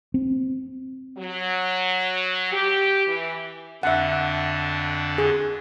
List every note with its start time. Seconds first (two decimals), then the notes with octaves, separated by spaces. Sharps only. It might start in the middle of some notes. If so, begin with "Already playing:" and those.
0.14 C4
1.18 F#3
2.52 G4
3.07 E3
3.83 F2 D3 D4 E5 F#5
5.18 G#4